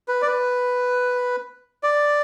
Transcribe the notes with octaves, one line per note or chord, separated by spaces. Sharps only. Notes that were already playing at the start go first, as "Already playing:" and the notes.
B4
D5
B4
D5